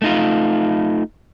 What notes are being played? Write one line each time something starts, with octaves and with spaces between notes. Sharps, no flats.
A3 D#4 F4